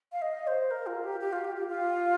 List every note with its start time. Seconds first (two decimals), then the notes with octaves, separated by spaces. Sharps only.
0.12 F5
0.22 D#5
0.47 C5
0.71 A#4
0.87 F4
1.04 G4
1.20 G4
1.32 F4
1.44 G4
1.56 G4
1.68 F4